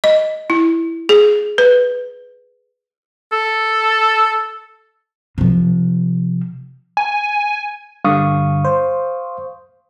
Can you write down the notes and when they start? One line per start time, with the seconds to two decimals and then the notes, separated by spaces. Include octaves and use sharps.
0.04 D#5
0.50 E4
1.09 G#4
1.58 B4
3.32 A4
5.38 C3 F3
6.97 G#5
8.04 G2 D3 F5 C#6 D#6
8.64 C5